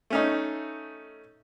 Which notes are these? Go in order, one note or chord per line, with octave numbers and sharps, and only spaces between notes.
A3 C#4 D#4